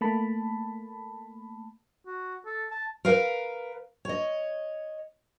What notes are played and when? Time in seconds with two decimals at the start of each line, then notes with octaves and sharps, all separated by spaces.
0.01 A3 A#3 A5 B5
2.06 F#4
2.45 A4
2.71 A5
3.05 A#4 B4 F5
4.05 C#5 D#5